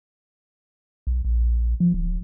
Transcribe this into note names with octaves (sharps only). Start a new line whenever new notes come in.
B1
A#1
F3
D1